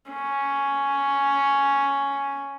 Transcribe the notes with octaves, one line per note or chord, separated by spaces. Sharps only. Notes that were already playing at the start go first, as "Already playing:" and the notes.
C#4